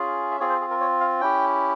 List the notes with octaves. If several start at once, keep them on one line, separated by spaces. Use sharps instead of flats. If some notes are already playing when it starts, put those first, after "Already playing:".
Already playing: C#4 F4 G#4
E5
C4 F4 G#4 C#5
C5
G#4
A#4
C#5
F5
C#4 E4 G4 G5